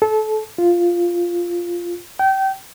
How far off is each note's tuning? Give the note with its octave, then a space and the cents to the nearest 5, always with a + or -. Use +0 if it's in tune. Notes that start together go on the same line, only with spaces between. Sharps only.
A4 -25
F4 -5
G5 -25